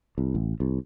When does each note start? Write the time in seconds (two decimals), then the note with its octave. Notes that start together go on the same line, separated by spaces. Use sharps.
0.18 C2
0.35 A1
0.60 C2